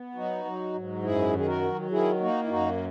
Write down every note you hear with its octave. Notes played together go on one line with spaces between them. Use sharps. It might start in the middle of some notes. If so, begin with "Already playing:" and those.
Already playing: B3
F#3 D#4 F#4
F#3
G#2
F#2 E4 G#4
D#3
G#4
F#4 A#4
F#3
D#3 E4 G#4
A#3 D#4 F#4
E4
F#2 D#4 F#4